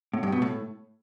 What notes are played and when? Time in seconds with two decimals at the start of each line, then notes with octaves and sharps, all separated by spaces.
0.13 A2
0.23 G2
0.32 B2
0.42 A2